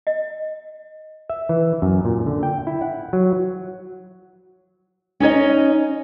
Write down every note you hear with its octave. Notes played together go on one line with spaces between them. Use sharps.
D#5
E5
E3
F#2
A#2
D3
G5
E4
F#5
F#3
C#4 D#4 C#5 D#5